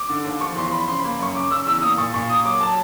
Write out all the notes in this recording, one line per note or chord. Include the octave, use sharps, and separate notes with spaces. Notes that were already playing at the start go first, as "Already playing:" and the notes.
Already playing: D6
D3
D#2
F3 C#6
E2 C6
C6
F3 B5
C#3 C6
A#3 B5
F#2 C#6
C#3 D6
C#3 E6
E2 E6
A#3 D#6
A#2 C#6
A#2 C#6
A#3 D#6
F#3 D6
F#3 A5